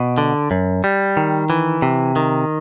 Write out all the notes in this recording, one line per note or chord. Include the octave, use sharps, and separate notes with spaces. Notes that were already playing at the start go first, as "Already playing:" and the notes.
Already playing: B2
D3
F#2
G3
D#3
E3
C3
D#3